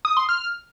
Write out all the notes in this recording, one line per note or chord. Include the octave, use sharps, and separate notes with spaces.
D#6
C6
F6